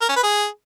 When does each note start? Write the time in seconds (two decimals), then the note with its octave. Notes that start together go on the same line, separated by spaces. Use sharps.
0.01 A#4
0.09 C#4
0.16 B4
0.23 G#4